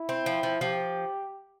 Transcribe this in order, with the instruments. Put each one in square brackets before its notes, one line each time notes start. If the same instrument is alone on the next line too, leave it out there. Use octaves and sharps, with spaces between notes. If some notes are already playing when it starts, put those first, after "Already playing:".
Already playing: [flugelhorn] E4
[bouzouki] C4
F3
F3
[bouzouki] F3 [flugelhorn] G4